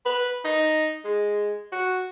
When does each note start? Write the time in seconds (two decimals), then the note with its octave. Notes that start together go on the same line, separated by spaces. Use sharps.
0.05 B4
0.45 D#4
1.04 G#3
1.72 F#4